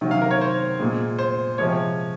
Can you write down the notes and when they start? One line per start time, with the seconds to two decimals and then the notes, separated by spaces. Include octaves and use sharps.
0.01 C3 D#3 F#3
0.11 F5
0.22 A#4
0.31 C#5
0.41 C5
0.80 A#2 G#3
1.19 C5
1.58 C3 F3 G#3 C#5